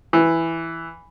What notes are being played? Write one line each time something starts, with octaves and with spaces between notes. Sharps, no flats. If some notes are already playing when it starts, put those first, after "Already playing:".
E3